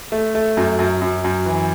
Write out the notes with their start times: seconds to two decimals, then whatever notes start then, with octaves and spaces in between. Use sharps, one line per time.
0.12 A3
0.35 A3
0.57 F#2
0.79 F#2
1.02 F#2
1.24 F#2
1.46 E3